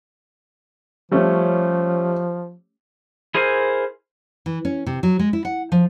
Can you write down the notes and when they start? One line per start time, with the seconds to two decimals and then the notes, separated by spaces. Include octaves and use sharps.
1.11 F3 G3 A3 C#4
3.35 E4 G#4 A#4 C5 G#5
4.46 E3
4.65 C#4
4.86 C3
5.03 F#3
5.19 G#3
5.33 E4
5.45 F#5
5.72 F3